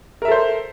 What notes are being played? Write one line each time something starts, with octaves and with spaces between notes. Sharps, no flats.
A4 A#4 C5 E5